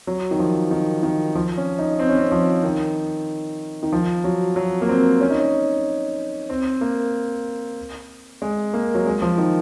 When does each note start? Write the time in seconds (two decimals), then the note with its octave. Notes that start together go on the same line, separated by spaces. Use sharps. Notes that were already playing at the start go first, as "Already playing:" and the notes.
0.07 F#3
0.31 D#3
0.39 F3
0.71 D#3
1.03 D#3
1.35 F3
1.57 C#4
1.78 D#4
1.99 C4
2.09 C#4
2.18 C4
2.32 F3
2.64 D#3
3.83 D#3
3.93 F3
4.24 F#3
4.56 F#3
4.82 A#3
4.89 C4
5.21 C#4
5.30 D#4
5.40 C#4
6.50 C4
6.81 A#3
8.42 G#3
8.74 A#3
8.95 F#3
9.06 G#3
9.22 F3
9.38 D#3